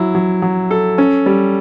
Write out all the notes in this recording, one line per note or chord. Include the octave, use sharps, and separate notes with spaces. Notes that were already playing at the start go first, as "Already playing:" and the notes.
Already playing: F#3 E4
F#3
F#3
A4
C#4
G3